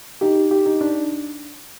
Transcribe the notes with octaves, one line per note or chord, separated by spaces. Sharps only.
D#4 G4
G4
D#4
D4